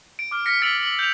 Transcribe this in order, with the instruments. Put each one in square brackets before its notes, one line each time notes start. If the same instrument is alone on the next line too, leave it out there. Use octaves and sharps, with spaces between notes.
[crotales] D7
D6 F6
F6 A#6 B6 C#7
E6 A6 B6 D7 F7 F#7
F#7
G6 F7